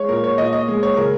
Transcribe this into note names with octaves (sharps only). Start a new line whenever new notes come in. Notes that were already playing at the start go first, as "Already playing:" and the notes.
Already playing: G#3 C#5
A#2 A#4
C#5
A#2 D#5
D#5
G#3
C#5
C#3 A#4